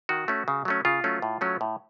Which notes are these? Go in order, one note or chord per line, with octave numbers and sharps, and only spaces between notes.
D#3 F#4
A3 C#4
C#3
F#3 A3 C#4
C#3 F4
F#3 A3 C#4
A2
F#3 A3 C#4
A2